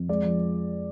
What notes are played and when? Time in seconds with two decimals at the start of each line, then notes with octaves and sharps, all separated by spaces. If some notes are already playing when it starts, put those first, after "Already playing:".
Already playing: F2
0.09 G#3 D5
0.24 F3